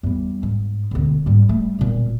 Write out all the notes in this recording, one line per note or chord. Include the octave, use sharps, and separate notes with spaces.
E2 G3
G#2
E1 D2
G#2 G3
G3 A3
E1 A#2